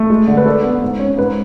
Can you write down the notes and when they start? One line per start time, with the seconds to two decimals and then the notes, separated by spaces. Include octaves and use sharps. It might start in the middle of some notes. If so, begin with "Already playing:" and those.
Already playing: A3
0.10 G#3
0.28 D3
0.37 B4
0.46 D4 A4
0.64 B3
0.83 G#2
0.99 C#4
1.17 G#2 B4